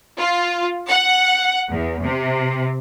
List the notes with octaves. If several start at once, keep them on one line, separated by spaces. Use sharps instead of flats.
F4
F#5
E2
C3